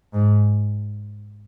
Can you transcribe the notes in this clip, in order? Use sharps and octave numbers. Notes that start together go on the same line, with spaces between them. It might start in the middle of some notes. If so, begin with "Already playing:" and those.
G#2